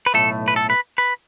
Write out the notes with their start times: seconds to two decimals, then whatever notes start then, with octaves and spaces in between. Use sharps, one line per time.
0.06 B4
0.14 B1 A2 A3 A4
0.48 B4
0.56 A4
0.70 B4
0.98 B4